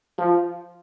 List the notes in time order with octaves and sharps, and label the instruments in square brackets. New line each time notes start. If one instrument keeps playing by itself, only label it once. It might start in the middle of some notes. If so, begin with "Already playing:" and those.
[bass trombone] F3